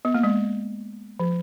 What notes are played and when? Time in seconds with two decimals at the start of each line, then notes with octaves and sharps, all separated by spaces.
0.05 B3
0.14 A#3
0.23 G#3
1.20 F3